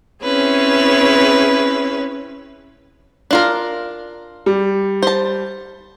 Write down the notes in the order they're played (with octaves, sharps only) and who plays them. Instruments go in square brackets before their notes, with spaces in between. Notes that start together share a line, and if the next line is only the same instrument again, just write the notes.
[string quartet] C4 C#4 E4 G#4 B4 C#5
[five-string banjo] D4 F4 A#4
[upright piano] G3
[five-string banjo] C5 A5